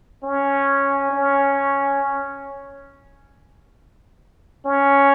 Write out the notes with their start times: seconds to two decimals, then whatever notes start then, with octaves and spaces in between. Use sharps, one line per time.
0.23 C#4
1.11 C#4
4.66 C#4